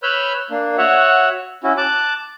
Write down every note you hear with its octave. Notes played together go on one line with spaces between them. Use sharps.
B4 C#5 B5 E6 F6 G6
A#3 D4
F#4 C#5 E5 F#5
C#4 E4 F#4
A5 D6 F#6